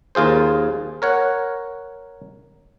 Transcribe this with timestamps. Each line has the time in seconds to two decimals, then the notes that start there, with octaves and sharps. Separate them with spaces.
0.15 D#2 F4 G#4 C5
1.02 A#4 C#5 F#5